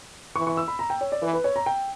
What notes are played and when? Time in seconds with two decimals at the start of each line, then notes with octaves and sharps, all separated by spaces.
0.36 E3 C#6
0.47 C#6
0.57 E6
0.68 B5
0.79 A#5
0.90 G5
1.01 C#5
1.12 D5
1.22 E3 B4
1.33 B4
1.44 C#5
1.56 A#5
1.66 G5